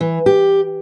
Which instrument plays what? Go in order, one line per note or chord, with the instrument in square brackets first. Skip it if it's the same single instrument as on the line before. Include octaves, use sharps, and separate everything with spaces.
[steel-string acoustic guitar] E3
G4